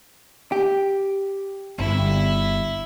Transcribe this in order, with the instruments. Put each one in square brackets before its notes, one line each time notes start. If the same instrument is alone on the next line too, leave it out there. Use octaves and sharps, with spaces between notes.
[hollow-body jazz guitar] G4
[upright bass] G1 [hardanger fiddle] E4